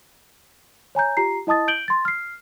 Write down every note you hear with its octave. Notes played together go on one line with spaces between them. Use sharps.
C#5 G#5 A#5 G6
F4 G4 A#5 C7
E4 D#5 A5 D#6 A6
G6 D7 F#7 G7
C6 A6
F6 C7